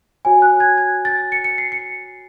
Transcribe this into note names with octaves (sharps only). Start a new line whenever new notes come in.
F#4 C#5 G#5
F#6
G#6
G#6
A6
C#7
C#7
C7
C#7